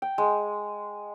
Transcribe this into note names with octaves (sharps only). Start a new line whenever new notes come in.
G5
G#3